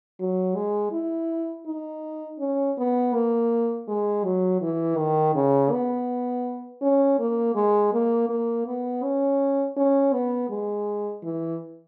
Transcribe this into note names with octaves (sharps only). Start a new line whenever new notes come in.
F#3
G#3
E4
D#4
C#4
B3
A#3
G#3
F#3
E3
D#3
C#3
B3
C#4
A#3
G#3
A#3
A#3
B3
C#4
C#4
B3
G#3
E3